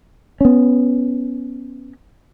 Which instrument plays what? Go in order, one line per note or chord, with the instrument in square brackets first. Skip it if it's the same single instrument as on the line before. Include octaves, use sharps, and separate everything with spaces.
[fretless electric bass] B3 C#4